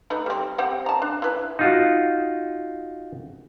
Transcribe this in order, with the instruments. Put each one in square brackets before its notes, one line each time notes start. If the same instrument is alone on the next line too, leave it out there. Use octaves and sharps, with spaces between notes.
[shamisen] A3 D#4 B4
G3 C4
C4 G4 F#5
A5 A#5
D4
E4 B4
[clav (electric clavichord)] D#4 F4 F#4